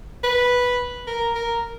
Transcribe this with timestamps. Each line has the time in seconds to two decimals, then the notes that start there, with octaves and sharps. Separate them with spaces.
0.24 B4
1.07 A#4
1.35 A#4